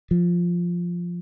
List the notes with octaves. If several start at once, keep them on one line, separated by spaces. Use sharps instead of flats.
F3